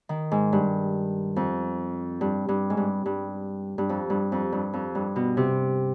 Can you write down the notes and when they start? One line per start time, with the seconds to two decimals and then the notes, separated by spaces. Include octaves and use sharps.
0.09 D#3
0.32 G#2
0.53 G2
1.36 F2
2.21 G2
2.49 G2
2.70 G#2
2.77 G2
3.06 G2
3.78 G2
3.89 F2
4.10 G2
4.32 F2
4.52 G2
4.73 F2
4.95 G2
5.16 B2
5.37 C3